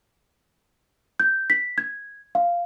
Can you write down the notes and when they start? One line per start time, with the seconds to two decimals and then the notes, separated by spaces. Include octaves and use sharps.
1.20 G6
1.50 B6
1.78 G#6
2.35 F5